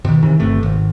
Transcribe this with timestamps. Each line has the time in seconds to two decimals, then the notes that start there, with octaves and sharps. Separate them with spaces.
0.05 B2 D#3
0.23 C3 D#3 E3
0.39 G1 C3 A3
0.63 G#1